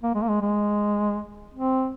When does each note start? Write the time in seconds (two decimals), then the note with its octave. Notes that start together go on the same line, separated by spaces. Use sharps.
0.03 A#3
0.15 G#3
0.22 A#3
0.29 G#3
0.41 G#3
1.54 C4